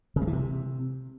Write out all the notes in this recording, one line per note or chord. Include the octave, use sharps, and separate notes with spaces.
C#3
G#3
E3
C3